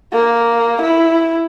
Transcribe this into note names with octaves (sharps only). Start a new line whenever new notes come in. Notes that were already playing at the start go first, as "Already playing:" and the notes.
A#3
E4